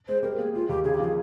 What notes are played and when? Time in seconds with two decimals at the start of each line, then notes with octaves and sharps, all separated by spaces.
0.08 G#3 C5
0.23 G3 A#4
0.38 A#3 G#4
0.53 G#3 F4
0.69 D#2 G4
0.84 C#3 G#4
0.94 G4
1.00 F3 G#4